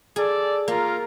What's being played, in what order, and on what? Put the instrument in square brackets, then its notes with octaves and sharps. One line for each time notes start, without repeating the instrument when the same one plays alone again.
[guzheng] G#4 [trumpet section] A4 D5
[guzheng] A#3 [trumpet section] F4 A#4